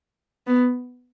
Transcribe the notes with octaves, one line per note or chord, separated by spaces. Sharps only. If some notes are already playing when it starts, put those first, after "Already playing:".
B3